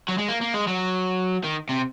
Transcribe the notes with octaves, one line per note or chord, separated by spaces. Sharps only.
F#3
G#3
A#3
A#3
G#3
F#3
D#3
C3